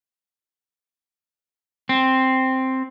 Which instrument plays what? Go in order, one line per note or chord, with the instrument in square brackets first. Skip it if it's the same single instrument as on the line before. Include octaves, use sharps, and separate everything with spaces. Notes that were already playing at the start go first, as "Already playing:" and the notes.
[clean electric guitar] C4